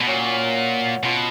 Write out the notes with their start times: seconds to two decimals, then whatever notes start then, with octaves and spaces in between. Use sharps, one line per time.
0.01 B2
0.07 A#2 F#3 C#4 F#4
1.03 B2 C#4 F4 B4